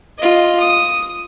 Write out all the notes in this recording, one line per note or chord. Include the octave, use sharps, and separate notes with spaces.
F4 D#5
D#6